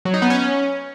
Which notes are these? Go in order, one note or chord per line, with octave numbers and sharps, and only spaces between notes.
F#3
D#4
B3
C#4